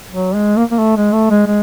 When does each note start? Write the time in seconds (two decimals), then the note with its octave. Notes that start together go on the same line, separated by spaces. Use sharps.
0.11 F#3
0.34 G#3
0.57 A#3
0.71 A#3
0.79 A3
0.97 G#3
1.12 A3
1.30 G#3
1.47 G#3